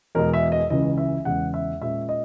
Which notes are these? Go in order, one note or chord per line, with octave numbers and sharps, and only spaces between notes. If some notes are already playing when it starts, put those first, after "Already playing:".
E2 B2 G#3 A#4
E5
D#5
C#2 C#3 E3 D#5
E5
E2 C#3 G#3 F#5
E5
A#2 G#3 C#4 E5
D#5